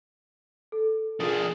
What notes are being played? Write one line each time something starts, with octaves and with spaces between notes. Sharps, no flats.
A4
D4 F4 G#4 A#4 D#6